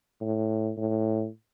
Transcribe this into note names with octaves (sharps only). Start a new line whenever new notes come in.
A2
A2